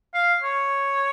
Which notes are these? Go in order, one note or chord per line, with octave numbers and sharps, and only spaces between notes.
F5
C#5